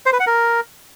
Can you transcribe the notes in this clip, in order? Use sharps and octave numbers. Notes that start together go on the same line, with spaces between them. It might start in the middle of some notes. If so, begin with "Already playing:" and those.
C5
B4
F#5
A#4